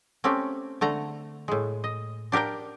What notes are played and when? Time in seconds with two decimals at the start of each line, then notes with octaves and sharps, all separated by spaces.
0.24 A3 C4 C#4 G4
0.81 D3 A3 A#5
1.48 A2 G#3
1.84 D#5
2.32 D4 G4 A#4 F5 G5